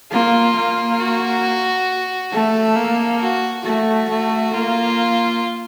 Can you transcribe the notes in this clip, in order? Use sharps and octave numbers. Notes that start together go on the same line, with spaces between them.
A#3 F4
A#3
F#4
A3 A4
A#3
F#4
A3 F#4
A3
A#3 F4